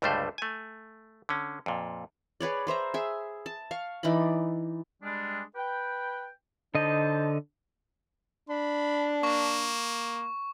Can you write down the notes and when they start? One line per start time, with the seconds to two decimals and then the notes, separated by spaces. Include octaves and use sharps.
0.02 C#2 G2 D3 G3 A3 C5
0.38 A3 G#5
1.29 D3 C#4
1.66 F2 A#2
2.40 G#4 B4 C#5 D5
2.67 B4 C5 E5 A#5
2.94 G#4 E5
3.46 A5
3.71 F5 C#6
4.03 E3 D#4 D5 B5
5.03 G3 G#3 D4
5.56 B4 G5
6.75 D3 D#4 C5 D#5 A5
8.49 D4 B5
9.23 A#3 C#6